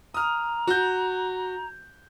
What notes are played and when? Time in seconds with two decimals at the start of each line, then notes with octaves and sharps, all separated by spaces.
0.14 A#5 D#6 F6
0.67 F#4 G6